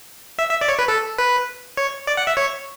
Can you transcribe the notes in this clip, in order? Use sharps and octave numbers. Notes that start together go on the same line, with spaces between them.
E5
E5
D5
C#5
B4
A4
B4
C#5
D5
F#5
E5
C#5